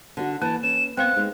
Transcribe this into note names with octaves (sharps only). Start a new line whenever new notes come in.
D3 D4 F#4
E3 A#3 A5
C#4 E7
B3 C4 C5 F5 G5 F#6
G#3 D#4